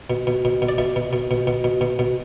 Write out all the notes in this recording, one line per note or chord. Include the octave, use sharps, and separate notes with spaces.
B2
B2
B2
B2
D5
B2 E5
B2
B2
B2
B2
B2
B2
B2